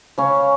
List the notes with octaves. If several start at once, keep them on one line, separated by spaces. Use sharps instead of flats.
C#3 C#4 C#5